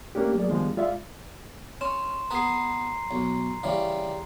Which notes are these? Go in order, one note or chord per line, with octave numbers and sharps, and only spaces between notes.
A3 A#3 C#4 D4 G4
F#3 A3 A#3 G#4 D5
D#3 F3 G3 G#3 B3 D4
G#3 F4 D5 E5 F5
C#4 C6 E7
B3 G#4 B4 A#5 C7
B1
C#3 E3 G3